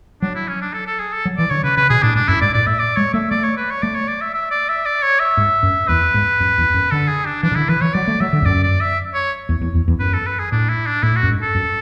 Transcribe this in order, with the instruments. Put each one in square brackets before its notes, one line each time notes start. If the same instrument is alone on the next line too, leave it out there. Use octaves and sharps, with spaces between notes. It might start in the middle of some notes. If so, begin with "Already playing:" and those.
[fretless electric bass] F#3 [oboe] D4
[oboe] E4
C#4
D4
A4
A4
G#4
A4
[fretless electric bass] F#3
[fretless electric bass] E3 [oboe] D5
[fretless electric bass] D3 [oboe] C#5
[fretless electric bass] C#3 [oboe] B4
[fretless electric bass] C#3 [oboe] B4
[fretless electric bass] B2 [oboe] G#4
[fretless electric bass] A2 [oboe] D4
[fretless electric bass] G#2 [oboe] D4
[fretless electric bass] F#2 [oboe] E4
[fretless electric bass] G#2 [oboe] D5
[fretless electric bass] A2 [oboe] D5
[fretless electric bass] A2 [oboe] E5
[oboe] D5
[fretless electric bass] G#3 [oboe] C#5
[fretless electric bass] A3 [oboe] E5
[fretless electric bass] A3 [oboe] D5
[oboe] C#5
B4
C#5
[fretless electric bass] A3 [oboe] D5
[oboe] C#5
D5
E5
E5
D5
E5
D5
C#5
E5
[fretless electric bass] G#2
F#2
[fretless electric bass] E2 [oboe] B4
[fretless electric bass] G#2
F#2
E2
F#2
[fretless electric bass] D3 [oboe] A4
[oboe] G#4
D4
[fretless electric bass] E3 [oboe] D4
[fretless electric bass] C#3
[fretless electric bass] D3 [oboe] E4
[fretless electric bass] E3 [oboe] B4
[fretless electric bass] E3 [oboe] C#5
[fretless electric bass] F#3 [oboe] D5
[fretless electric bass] A3
[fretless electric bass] F#3 [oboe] E5
[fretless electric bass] D3
E2
[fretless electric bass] F#2 [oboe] D5
[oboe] D5
E5
C#5
[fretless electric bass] E2
E2
E2
E2
[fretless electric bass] F#2 [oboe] B4
[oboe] A4
B4
G#4
[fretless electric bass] A2 [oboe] D4
[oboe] E4
D4
[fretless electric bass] A2 [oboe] E4
[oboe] F#4
[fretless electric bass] F#2
G#2
[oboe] A4
[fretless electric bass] F#2